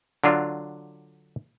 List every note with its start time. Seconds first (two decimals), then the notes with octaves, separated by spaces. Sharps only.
0.24 D3 F#3 D4 F4